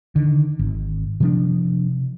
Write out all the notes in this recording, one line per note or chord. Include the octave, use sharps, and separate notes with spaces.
D3 D#3
G#1
C3 F3 D4